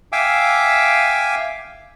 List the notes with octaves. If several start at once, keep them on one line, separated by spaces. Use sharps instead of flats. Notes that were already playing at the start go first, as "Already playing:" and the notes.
E5 F5 G5 G#5 D6 E6